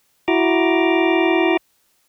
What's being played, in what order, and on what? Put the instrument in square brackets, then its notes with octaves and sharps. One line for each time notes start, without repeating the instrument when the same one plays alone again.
[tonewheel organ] E4 F#4 A#5 D6